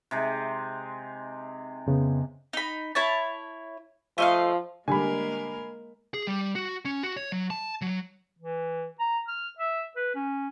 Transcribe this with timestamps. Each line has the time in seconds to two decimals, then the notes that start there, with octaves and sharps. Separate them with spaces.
0.11 C3 G#3 D#4
1.86 F2 C#3 B3
2.53 D#4 B5
2.95 E4 C#5 A5
4.18 F3 A3 D#5 F5
4.88 D3 G3 G#3 A#3 A#4 G#5 B5
6.14 G#4
6.27 G3
6.55 F#4
6.85 C#4
7.03 F#4
7.17 C#5
7.32 F#3
7.50 A5
7.82 F#3
8.39 E3
9.00 A#5
9.28 F6
9.59 E5
9.96 B4
10.15 C#4